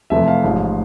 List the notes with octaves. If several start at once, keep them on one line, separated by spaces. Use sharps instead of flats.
F1 F2 C3 E3 A3 E5
F5
A1 G#2 F3